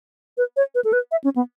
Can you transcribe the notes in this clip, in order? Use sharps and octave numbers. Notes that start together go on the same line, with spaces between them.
B4
C#5
B4
A4
B4
E5
C#4
B3